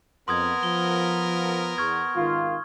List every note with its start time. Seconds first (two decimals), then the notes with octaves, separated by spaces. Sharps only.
0.28 F2 B3 A#4 C6 D#6 G#6
0.63 F3 G7
1.78 E2 C#6 F6 G#6
2.16 G#1 D#3 F4